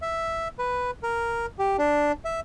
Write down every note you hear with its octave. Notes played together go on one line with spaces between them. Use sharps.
E5
B4
A#4
G4
D4
E5